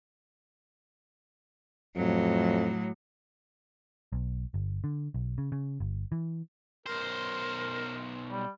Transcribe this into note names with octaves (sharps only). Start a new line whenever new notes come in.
F2 A2 F#3
B1
G1
D3
B1
C#3
C#3
G1
E3
B1 A#4 C5
G3